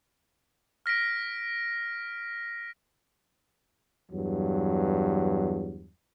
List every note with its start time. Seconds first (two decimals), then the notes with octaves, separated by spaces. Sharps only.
0.86 F6 A#6 B6 D7
4.11 E2 G2 F#3